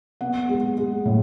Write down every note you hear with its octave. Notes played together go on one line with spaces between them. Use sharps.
B3 F#5
G#3
G#3
A2